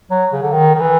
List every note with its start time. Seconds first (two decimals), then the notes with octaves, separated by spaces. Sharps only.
0.10 F#3
0.33 C#3
0.42 D3
0.52 D#3
0.75 D#3
0.80 E3